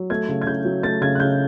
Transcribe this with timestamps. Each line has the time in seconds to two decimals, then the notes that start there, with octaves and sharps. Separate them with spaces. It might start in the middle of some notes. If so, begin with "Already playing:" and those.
Already playing: F#3
0.10 A3 G#6
0.29 C#3
0.42 G#6
0.46 C#3 G6
0.65 F#3
0.83 A3 A6
1.01 C#3 G#6
1.15 F#6
1.20 C#3 G6